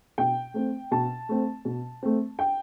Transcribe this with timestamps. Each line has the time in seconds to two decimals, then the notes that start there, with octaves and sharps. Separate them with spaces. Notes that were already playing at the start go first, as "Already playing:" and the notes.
0.18 B2 G5
0.54 A3 C4
0.91 B2 A5
1.29 A3 C4
1.65 B2
2.03 A3 C4
2.39 G5